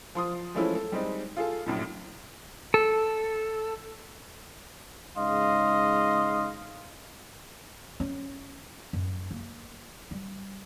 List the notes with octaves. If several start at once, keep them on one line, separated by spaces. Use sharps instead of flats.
F3 C6 D#6
E3 F3 G#3 A3 C#4 E4
A4
G3 G#3 C4 D#4
F4 G#4 A4
A#1 F#2 A2
A4
G#2 C#3 D#5 F5 C6
C#4
F#2
A#3
G3